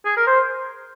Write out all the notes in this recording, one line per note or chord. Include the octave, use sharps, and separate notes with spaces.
G#4
A#4
C5